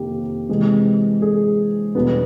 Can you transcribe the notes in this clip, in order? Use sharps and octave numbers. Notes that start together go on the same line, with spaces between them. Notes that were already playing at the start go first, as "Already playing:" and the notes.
Already playing: F2 C3 D#3 A#3 G4
C3 E3 G#3
G#4
E2 B2 G3 B3